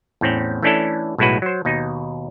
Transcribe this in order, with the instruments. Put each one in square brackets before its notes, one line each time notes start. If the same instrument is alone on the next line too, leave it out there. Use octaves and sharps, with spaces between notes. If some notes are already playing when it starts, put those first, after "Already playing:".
[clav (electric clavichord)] E2 A2 C4 C#4
E3 A3 C#4 D4 E4 A4
B1 A2 G#3 E4 F#4 B4
F#3 C5
D#2 B2 D#4